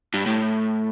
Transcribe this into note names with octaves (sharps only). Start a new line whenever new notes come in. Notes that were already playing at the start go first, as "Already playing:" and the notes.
G2
A2